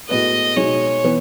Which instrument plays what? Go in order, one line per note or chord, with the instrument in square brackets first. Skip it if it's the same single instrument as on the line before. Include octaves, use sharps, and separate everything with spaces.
[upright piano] A2 G#3 B3 F#4 B4 [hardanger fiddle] D#5
[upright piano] B2 G#3 D#4 [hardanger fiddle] C#5
[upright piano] E3 B3